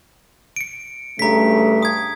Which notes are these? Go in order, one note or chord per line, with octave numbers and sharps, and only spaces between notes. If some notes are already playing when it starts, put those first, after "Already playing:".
C#7 D7
G2 C#3 A3 A#5 B6
D#6 G#6